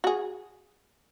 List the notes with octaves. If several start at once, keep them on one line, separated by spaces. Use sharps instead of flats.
F#4 G#4